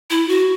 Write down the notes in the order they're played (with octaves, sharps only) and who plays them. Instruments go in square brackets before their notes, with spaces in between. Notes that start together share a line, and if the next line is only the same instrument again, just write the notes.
[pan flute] E4
F#4